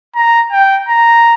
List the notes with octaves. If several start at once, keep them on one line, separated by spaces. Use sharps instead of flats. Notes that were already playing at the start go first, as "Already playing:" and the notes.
A#5
G5
A#5